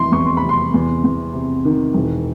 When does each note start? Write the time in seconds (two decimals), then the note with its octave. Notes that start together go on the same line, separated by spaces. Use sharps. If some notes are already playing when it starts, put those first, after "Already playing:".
Already playing: F1 E3 C6
0.12 E2 C#6
0.25 C6
0.37 B5
0.42 C3
0.49 C6
0.74 E2
1.04 E2
1.33 C3
1.65 D#3
1.94 E1